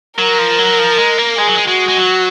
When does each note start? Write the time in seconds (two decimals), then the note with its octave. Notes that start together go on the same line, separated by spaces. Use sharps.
0.18 F#3 A#4
0.39 F3
0.59 F#3
0.79 F3
0.98 G#3
1.18 A#3
1.38 G#3 G#4
1.47 F#3
1.55 G#3
1.67 G#3 F#4
1.88 G#3
1.97 F#3